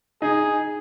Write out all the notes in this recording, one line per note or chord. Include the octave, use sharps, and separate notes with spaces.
D#4 G#4